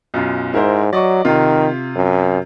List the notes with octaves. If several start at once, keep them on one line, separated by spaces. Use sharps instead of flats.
B1 F#2 F4
G#2 E4 A#4 C5
F#3 D5 D#5 C#6
C3 D#3 F4
F#2